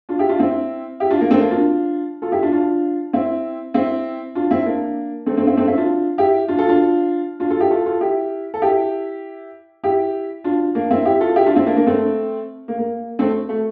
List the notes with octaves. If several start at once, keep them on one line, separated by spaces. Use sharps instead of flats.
D4 F4
E4 G4
D4 F4
C4 E4
E4 G4
D4 F4
A#3 D4
A3 C4
A#3 D4
D4 F4
F4 A4
E4 G4
D4 F4
D4 F4
C4 E4
C4 E4
D4 F4
C4 E4
A#3 D4
A3 C4
A3 C4
C4 E4
A3 C4
C4 E4
D4 F4
E4 G4
D4 F4
F4 A4
D4 F4
D4 F4
F4 A4
E4 G4
F4 A4
F4 A4
E4 G4
A4
E4 G4
E4 G4
D4 F4
A#3 D4
C4 E4
E4 G4
F4 A4
E4 G4
D4 F4
C4 E4
A#3 D4
A#3 D4
A3 C4
A#3
A#3
A3 C4
A3